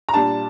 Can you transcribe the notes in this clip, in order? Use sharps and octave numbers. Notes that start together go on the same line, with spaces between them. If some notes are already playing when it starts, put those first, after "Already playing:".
A#5
A#2 G3 D4 A5